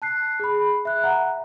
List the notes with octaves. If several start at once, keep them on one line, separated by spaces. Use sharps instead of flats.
A5 F#6 C7
G#4 B5
E5 F#6
E5 F#5 A#5